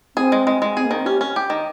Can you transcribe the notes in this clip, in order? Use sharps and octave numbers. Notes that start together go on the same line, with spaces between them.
C4 G#4
G#3
G#3
G#3
C4 G#4
A#3
D#3
C4
C#4 G4
C#4
G4
D#3